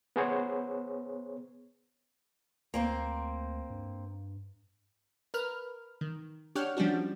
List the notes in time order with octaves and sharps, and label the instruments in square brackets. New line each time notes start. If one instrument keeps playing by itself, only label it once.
[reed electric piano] B3 G#4 C5 C#5
[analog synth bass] D2 [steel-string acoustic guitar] A#3 C4 C5
[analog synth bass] G2
[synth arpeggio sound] A#4 B4 F6
D#3
D4 G4 C#5 F#5 G5 F6
F3 G3 C#4 D4 F#4